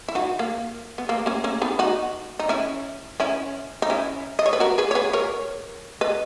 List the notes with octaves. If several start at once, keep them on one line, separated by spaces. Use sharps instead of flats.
E4
D#4 F#4
A#3
B3
A#3
A#3 C#4
A#3 C#4
B3 D#4
D#4 F#4
D#4
C#4 E4
C#4 E4
D#4
C#4 E4
D#5
C#5
B4
F#4 A#4
G#4 B4
C#5
G#4 B4
A#4 C#5
B4 D#5